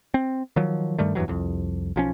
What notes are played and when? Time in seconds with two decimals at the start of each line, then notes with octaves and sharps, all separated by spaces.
0.14 C4
0.56 D#3 F3 F#3
0.99 G2 D#3 G3 A3
1.15 E2 G2 E3 F#3
1.28 C2 F2
1.96 B1 F3 C#4